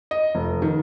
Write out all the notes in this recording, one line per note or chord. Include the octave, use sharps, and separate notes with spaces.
D#5
F1
D#3